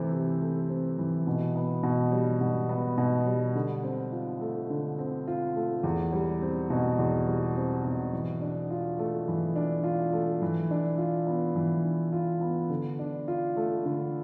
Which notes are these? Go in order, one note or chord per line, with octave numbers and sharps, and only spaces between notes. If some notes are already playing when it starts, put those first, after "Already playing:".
Already playing: C3 E3 A3 C4
C3
A3
C4
E3
B2
B3
B2
G3
B2
B3
B2
G3
D3
C4
F4
A3
D3
C4
F4
A3
E2
G3
C4
B2
E2
G3
C4
B2
E3
D4
F4
A3
E3
D4
F4
A3
E3
D4
F4
B3
E3
D4
F4
B3
D3
D4
F4
A3
D3